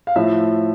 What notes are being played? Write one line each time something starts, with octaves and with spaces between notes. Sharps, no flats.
F5
A2 F3 E5